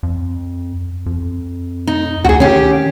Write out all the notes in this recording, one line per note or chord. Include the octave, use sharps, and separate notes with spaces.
F2
F2
D#4
D2 F#4 G#4
D#3 C#4 G4